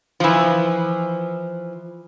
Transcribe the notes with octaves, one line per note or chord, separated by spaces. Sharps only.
E3 F3